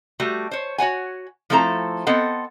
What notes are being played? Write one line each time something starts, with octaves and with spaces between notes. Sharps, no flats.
G3 A3 F#4
C5 C#5
F#4 C#5 F#5 G#5
F3 A3 C4 E4 A4 A#5
B3 C4 A4 D#5 F#5